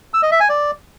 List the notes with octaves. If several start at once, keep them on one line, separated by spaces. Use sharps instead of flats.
E6
D#5
E5
G#5
D5